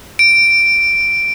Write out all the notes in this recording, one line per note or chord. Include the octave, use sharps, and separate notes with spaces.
D7